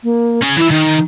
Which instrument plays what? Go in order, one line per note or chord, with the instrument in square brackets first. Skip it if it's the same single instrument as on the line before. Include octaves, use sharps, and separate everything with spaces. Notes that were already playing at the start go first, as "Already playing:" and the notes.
[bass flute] A#3
[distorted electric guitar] C#4 G#4
[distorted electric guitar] E3 E5 [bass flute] E4
[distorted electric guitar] D#3 [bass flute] D#4